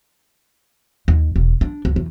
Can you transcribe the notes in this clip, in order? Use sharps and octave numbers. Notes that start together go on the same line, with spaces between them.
D#2
E1
D4
C#2
E2